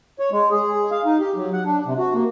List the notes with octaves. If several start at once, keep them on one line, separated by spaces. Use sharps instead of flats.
C#5
G#3
G#4
F5
D#4
G4
F#3
F#5
D4
C3
F#4
A#3